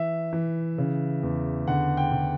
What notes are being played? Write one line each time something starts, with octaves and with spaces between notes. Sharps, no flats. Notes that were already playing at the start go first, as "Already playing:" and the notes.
Already playing: E3 E5
E3
C#3
E2
D3 F#5
G5
D3